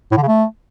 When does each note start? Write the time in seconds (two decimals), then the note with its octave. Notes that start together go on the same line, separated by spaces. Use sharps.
0.12 A2
0.17 D3
0.22 C#3
0.28 A3